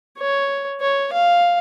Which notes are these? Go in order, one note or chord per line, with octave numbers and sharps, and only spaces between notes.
C#5
C#5
F5